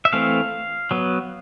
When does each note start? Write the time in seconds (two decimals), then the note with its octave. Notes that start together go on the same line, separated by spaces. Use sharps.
0.05 E5
0.13 E3 A3 C4 F5
0.91 F#3 B3